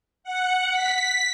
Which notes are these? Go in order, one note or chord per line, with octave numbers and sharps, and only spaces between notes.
F#5
B6